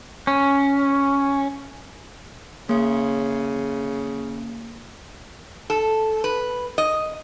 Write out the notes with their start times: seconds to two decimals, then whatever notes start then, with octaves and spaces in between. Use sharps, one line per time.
0.27 C#4
2.69 C#3 A#3
5.70 A4
6.24 B4
6.78 D#5